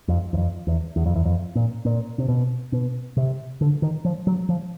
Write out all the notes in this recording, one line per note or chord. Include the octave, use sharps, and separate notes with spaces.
F2
E2
F2
E2
E2
F2
E2
F2
A#2
A#2
C3
B2
B2
C3
D3
D#3
F3
F#3
F3